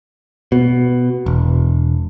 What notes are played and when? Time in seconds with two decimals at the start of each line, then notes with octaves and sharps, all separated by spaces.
0.52 B2
1.26 E1